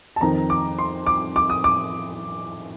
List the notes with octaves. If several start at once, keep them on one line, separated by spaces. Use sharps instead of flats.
A5
F2 D#3 A#5
D6
C6
D6
D6
D#6
D6